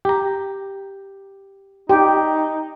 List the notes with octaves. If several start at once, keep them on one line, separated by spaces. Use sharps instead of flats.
G4 A#5
D#4 G4